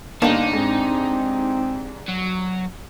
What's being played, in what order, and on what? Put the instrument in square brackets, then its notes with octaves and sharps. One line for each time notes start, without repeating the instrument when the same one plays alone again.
[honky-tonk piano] G1 A#3 E7 [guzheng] D4 G4 [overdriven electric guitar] D#4
[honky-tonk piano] G#2 [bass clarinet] C4
[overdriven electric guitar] F#3